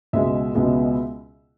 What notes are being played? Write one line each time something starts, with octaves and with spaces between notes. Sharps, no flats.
C#2 B2 G#3 B3 E5
C#2 B2 G#3 B3